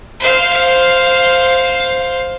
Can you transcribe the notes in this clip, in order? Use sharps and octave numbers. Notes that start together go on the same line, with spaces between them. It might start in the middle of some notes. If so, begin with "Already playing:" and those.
C5 F5